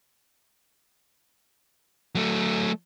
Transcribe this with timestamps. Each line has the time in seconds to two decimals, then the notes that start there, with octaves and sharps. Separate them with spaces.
2.15 F#3 A3